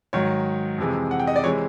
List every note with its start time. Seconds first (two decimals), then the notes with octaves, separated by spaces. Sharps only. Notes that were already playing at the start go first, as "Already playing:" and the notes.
0.13 G#2 D#3 F#3 C#5
0.78 F2 C3 E3 G#3
1.11 F#5
1.20 G5
1.27 D#5
1.36 D5
1.44 C3 E3 G#3 C#5